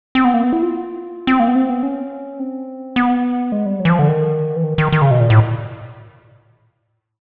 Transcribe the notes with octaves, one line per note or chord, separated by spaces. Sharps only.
C4
B3
A#3
B3
E4
F4
C4
A#3
B3
C4
B3
C#4
C4
B3
G#3
G3
F#3
E3
F3
D3
D#3
E3
D#3
D#3
D#3
C#3
B2
A#2
A2